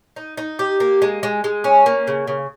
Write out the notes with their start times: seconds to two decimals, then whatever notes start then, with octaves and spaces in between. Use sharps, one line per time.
0.16 D#4
0.37 D#4
0.59 G4
0.80 A#3
1.02 G#3
1.23 G#3
1.44 G#3
1.64 C#4
1.86 A#3
2.07 C#3
2.27 C#3